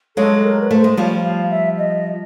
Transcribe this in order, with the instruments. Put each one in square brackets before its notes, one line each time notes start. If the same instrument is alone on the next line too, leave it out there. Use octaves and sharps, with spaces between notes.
[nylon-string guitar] F#3 G#3 [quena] A4
[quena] A#4
B4
[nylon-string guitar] A3 [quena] C5
[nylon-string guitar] G#3
[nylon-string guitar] F3 G3 [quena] C#5
[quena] F5
E5
D#5